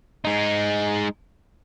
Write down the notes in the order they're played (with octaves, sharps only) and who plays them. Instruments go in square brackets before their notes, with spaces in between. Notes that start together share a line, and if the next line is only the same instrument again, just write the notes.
[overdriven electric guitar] G#3 D#4